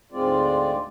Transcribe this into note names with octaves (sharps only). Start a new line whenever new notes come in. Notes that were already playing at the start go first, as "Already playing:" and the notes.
D2 G#2 G#3 C4 F4 D5